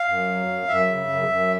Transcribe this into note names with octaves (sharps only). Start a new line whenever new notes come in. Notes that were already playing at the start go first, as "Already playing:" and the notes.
Already playing: F5
F#2
F#3
F#2
F#2 E5
C#3
F#2
F#2